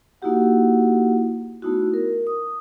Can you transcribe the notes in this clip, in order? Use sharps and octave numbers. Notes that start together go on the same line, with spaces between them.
A#3 D#4 E4 F#4 G4 F#5
A3 B3 D#4 E4 F#4
A#4
D#6